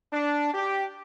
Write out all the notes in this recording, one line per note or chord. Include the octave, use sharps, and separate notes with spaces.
D4
G4